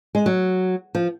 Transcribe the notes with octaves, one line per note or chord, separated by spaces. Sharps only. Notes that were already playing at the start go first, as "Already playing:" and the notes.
G#3
F#3
F3